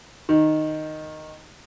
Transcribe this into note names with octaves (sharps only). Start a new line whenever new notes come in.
D#3